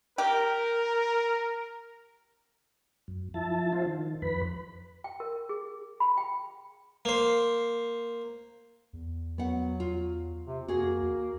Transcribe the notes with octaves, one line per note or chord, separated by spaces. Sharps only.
G4 A#4
F#2
F3 E4 A5
E4 F4 C5
D#3
F2 B4 B5
G5
A#4
G#4
B5
G5
A#3 C5
E2
F#3 B3 F#5
F4
C3
F2 A#3 F#4 G#4
D#2